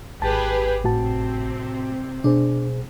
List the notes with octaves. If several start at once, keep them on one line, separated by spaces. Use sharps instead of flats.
G#1 G4 G#4 B4 A5
A2 C3 C4 F#4 A5
B2 D4 G#4 C5